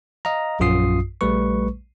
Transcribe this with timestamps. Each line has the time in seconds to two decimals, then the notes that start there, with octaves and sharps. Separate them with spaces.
0.25 D#5 F5 A#5
0.60 A#1 F#2 F4 D#6 C7
1.21 A#1 G3 A3 B4 C#6